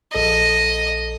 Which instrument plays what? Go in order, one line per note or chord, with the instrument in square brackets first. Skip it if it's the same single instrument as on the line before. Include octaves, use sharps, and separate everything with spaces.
[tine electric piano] A#1 A4 A#6 [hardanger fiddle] D#5